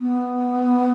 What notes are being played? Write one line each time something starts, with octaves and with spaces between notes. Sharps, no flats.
B3